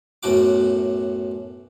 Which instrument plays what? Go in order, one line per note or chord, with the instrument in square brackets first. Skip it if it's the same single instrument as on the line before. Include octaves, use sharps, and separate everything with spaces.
[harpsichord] B1 F#2 A2 F#4 D6